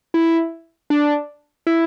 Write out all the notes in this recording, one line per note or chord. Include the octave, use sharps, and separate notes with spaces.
E4
D4
E4